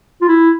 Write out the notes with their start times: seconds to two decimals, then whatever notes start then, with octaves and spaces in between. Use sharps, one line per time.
0.21 F4
0.28 E4